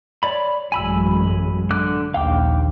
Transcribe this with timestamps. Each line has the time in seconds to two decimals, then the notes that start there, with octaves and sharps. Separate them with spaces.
0.23 C#5 D5 B5
0.72 A1 F#2 G#3 G#5 B5 E6
1.71 D3 D6 F#6
2.14 A#1 D#2 F5 G5 D6